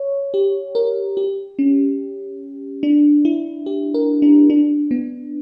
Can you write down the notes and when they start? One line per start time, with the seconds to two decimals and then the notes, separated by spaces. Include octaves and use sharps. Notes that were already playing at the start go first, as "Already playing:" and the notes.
Already playing: C#5
0.34 G4
0.75 A#4
1.17 G4
1.59 C#4
2.83 D4
3.25 E4
3.66 G4
3.94 A#4
4.22 D4
4.50 D4
4.91 B3